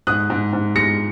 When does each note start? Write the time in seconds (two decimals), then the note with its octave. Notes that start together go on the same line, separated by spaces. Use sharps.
0.07 G#2 D#6 F#6
0.30 G#2
0.53 G#2
0.75 G#3 A#6 C#7